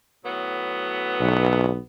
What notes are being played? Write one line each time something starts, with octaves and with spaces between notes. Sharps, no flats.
A2 F#3 B3
B1